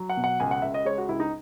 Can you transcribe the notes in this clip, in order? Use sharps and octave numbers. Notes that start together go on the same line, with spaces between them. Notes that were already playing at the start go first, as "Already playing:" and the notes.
Already playing: F#3
F#5
B2
F#5
C#2 G#5
F#5
C#2 E5
D#5
G#3 C#5
F#4
C#2 E4
D#4